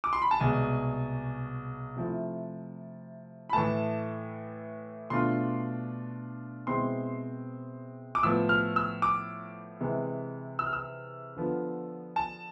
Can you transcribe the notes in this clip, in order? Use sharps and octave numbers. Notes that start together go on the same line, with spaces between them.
D6
C6
B5
A5
C2 B2 G#3 G#5
C3 F3 A3 E4
B5
A2 E3 A3 A5
B2 A3 D4 F4 C6
B2 G#3 C4 E4 C6
D6
A2 F3 B3 E6
F6
E6
D6
C3 E3 G#3
E6
F6
E6
D3 F3 B3
A5